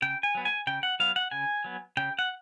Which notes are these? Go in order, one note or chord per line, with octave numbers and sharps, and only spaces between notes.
C#3 G5
G#5
F#3 B3
G#5
C#3 G5
F#5
F#3 B3 F5
F#5
C#3 G#5
F#3 B3
C#3 G5
F#5